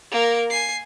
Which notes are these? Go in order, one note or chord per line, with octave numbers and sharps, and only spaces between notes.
A#3 A#4
G#5 C7